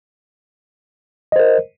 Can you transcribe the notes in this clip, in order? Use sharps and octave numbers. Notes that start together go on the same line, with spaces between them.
A#4 C5 D#5